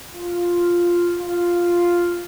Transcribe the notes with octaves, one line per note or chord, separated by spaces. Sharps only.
F4
F4